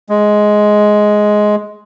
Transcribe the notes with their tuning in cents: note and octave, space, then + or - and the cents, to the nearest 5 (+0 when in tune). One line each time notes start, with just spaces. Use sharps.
G#3 +10